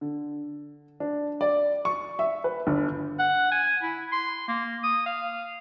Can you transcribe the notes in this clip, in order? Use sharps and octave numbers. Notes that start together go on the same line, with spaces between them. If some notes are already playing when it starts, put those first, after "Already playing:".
D3
D4
D5
C#6
E5
B4
G1
F#5
G#5
E4
C6
A#3
D#6
F5